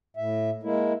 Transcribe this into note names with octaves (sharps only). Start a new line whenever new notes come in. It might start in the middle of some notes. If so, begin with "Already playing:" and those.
A2 E5
G#3 A#3 E4